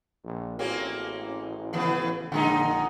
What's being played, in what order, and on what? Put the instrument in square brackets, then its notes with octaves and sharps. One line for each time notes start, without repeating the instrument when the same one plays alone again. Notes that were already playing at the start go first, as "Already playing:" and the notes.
[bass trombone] A#1
[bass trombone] A1 [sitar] A#3 C4 C#4 [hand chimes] F#4 G#4
[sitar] C#3 E3 B3
[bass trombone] A#1 [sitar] D3 G#3 D#4 [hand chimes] F#5 A#5